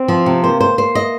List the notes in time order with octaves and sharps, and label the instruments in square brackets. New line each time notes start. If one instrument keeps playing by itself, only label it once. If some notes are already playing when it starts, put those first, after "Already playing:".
Already playing: [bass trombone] C4
[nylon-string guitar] F3
C3
[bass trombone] A#3 [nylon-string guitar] C5
[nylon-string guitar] C5
C5
D#5